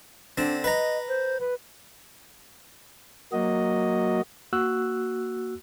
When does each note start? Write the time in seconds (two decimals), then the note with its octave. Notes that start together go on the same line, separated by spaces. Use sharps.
0.38 D3 C4 D4
0.64 B4 D#5 A#5
1.08 C5
1.40 B4
3.32 F#3 A#3 F#4 D#5
4.53 A#3 F#4 E6 F#6